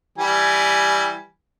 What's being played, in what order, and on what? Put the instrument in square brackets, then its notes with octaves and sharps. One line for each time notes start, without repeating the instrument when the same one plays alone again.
[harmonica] E3 G3 G#5